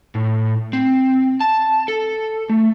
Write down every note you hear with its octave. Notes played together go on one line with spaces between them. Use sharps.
A2
C4
A5
A4
A3